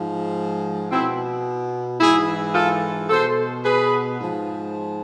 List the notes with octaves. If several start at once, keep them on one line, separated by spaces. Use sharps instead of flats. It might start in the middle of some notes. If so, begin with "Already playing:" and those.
Already playing: G#2 F3
B2 C4 E4
G#2 E3 E4 G#4
F4 A4
B2 A4 C5
G#4 B4
G#2 F3